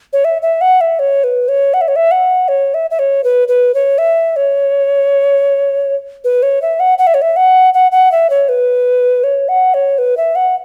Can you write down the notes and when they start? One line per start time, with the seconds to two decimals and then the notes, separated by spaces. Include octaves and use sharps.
0.13 C#5
0.25 E5
0.42 E5
0.61 F#5
0.81 E5
0.99 C#5
1.24 B4
1.49 C#5
1.74 F#5
1.81 E5
1.88 C#5
1.96 E5
2.11 F#5
2.48 C#5
2.74 E5
2.91 E5
2.99 C#5
3.24 B4
3.48 B4
3.74 C#5
3.98 E5
4.36 C#5
6.24 B4
6.43 C#5
6.62 E5
6.80 F#5
6.98 F#5
7.07 E5
7.14 C#5
7.22 E5
7.36 F#5
7.74 F#5
7.92 F#5
8.12 E5
8.30 C#5
8.49 B4
9.24 C#5
9.49 F#5
9.74 C#5
9.98 B4
10.17 E5
10.36 F#5